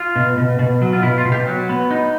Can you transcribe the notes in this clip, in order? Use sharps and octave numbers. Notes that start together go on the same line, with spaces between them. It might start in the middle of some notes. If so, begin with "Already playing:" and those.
Already playing: F4
B2
B2
B2
F#3
F4
B2 E4
F4
B2
G4
F#3
B3
D#4